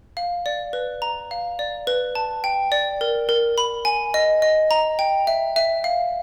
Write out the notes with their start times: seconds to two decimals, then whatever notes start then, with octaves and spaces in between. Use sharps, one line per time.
0.17 F5
0.46 D5
0.73 B4
1.02 A#5
1.31 F5
1.59 D5
1.87 B4
2.15 A5
2.44 G5
2.72 D5
3.01 A#4
3.29 A#4
3.58 B5
3.85 G#5
4.14 D#5
4.42 D#5
4.71 A#5
4.99 G5
5.27 E5
5.56 E5
5.84 F5